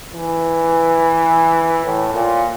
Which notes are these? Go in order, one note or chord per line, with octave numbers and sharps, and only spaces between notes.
E3
A2
A#2